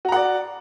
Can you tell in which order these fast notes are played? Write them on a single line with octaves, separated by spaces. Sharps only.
F#4 A#5 F#5 D5